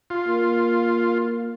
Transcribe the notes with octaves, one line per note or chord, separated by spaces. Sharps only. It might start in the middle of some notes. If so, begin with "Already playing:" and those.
F4
A#3